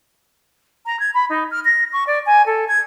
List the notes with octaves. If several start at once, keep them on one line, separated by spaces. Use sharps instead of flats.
A#5
G#6
B5
D#4
F6
A#6
C#6
D5
G#5
A4
G#6